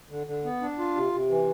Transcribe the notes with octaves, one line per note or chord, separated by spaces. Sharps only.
D3
D3
B3
D4
F4
C3
C3
E3